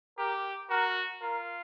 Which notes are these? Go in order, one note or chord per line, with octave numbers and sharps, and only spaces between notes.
G4 A#4
F#4 A#4
F4 A#4